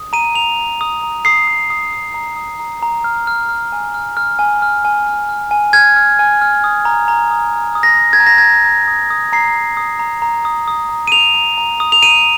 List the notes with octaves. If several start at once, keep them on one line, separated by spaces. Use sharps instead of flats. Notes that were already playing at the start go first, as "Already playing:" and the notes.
Already playing: D#6
A#5 D#7
A#5 F7
A#5
D#6
A#5
D#6 C7
D#6
D#6
D#6
A#5
D#6
A#5
A#5
F6
F6
F6
G#5
F6
F6
G#5
F6
G#5
F6
F6
G#5
F6 G#6
F6
G#5
F6
D#6
A#5
A#5
D#6
A#5
D#6
A#6
D#6
G#6
A#5
A#6
A#5 G#6
A#5
D#6
D#6
A#5 C7
A#5
D#6
A#5
A#5
D#6
D#6
A#5
D#7
D#6 F7
A#5
A#5
D#6
F7
A#5 D#7